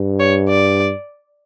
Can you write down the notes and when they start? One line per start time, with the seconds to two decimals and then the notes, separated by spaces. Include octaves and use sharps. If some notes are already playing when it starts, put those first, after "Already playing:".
Already playing: G2
0.20 C#5
0.49 D5